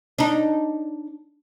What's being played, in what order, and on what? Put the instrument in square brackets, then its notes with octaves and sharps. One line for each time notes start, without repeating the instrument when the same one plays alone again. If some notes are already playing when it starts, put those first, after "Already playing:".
[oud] D4 D#4